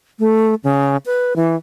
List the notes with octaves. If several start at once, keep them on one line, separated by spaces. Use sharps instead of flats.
A3
C#3
B4
E3